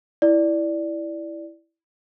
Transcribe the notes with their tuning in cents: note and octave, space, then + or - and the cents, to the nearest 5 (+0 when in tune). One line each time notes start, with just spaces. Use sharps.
E4 +0 D5 +0